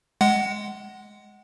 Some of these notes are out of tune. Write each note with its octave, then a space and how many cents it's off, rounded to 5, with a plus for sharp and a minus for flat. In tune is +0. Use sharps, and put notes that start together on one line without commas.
G#3 +0 F#5 +20